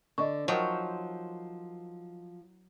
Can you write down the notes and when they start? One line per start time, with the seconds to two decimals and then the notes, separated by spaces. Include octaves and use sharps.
0.18 D3 D#5 C#6
0.48 D#3 F3 F#3 C5